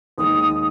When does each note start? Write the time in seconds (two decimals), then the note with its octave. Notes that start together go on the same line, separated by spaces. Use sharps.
0.18 D#2 D#3 G#3 D#4 D#6